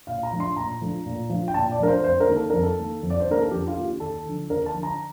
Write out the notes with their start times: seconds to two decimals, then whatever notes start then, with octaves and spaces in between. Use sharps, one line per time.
0.07 A#2 F5
0.23 A#5
0.32 F3 A3 D4
0.40 C6
0.56 A#2 A#5
0.81 F3 A3 D4
1.06 A#2
1.30 F3 A3 D4
1.48 G5
1.54 A#2 A5
1.72 D5
1.80 F3 A3 D4 A#4
1.88 C5
2.03 F2 C5
2.20 A#4
2.28 D#3 A#3
2.36 A4
2.50 F2 A#4
2.63 A4
2.78 D#3 A#3
3.03 F2
3.10 D5
3.20 C5
3.27 D#3 A#3 A#4
3.41 A4
3.51 F2 G4
3.67 F4
3.77 D#3 A#3
3.85 G4
4.00 D#2 A4
4.26 D3 F3
4.50 D#2 A#4
4.66 A5
4.74 D3 F3
4.83 A#5